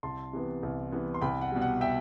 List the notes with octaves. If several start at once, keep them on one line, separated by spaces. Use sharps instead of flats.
C2 A5 C6
C3 E3 B3
C2
C3 E3 B3
C6
C2 G5 B5
F#5
B2 G3
F#5
E5 G5